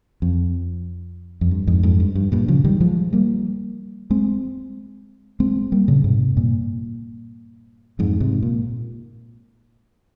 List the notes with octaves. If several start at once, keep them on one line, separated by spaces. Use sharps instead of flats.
F2
F2
G2
F2 G#2
F2 G#2
G2
G2
G2 A#2
C#3 F3
D#3 G3
F3 G#3
G3 A#3
G#3 C4
G#3 C4
G3 A#3
A#2 C#3
G#2 C3
G2 A#2
F2 G#2
G#2 C3
A#2